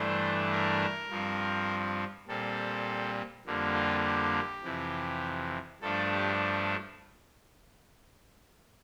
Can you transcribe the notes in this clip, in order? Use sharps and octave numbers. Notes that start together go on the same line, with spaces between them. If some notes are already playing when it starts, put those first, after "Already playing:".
Already playing: G2 E3 A3 D4 C5
A#4
G2 F3 C4
A#2 G3 C4 A4
F2 D3 G3 A#3
F4
G4
F2 C3 E3
G2 F3 A3 D4 A4
G4